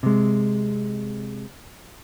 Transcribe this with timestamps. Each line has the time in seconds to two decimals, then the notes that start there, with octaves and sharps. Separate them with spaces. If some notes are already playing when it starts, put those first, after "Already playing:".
0.03 C3 G#3